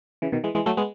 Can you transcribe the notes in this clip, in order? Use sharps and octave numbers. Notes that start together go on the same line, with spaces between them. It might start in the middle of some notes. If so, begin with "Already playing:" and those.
C#3 E3
B2 D#3
E3 G#3
E3 G#3
F#3 A3
G#3 B3